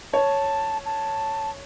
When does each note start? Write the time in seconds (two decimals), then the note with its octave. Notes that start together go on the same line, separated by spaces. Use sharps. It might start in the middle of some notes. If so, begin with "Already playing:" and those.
0.13 C#5 A5
0.85 A5